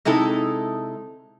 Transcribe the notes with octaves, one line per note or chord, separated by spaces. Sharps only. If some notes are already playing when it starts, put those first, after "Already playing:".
C3 G#3 D#4 E4 A4